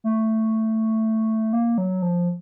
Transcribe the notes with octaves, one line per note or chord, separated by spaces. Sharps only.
A3
A#3
F#3
F3